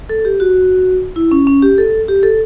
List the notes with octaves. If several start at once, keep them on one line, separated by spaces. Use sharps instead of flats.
A4
G4
F#4
E4
C#4
C#4
G4
A4
G4
A4